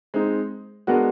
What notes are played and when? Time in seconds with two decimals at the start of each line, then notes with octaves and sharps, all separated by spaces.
0.14 G#3 C4 D#4
0.87 G#3 B3 D4 F#4 A#4